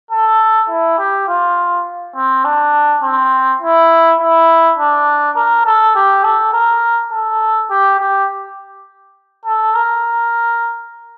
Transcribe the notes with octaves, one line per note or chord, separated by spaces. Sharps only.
A4
E4
G4
F4
C4
D4
C4
E4
E4
D4
A#4
A4
G4
A4
A#4
A4
G4
G4
A4
A#4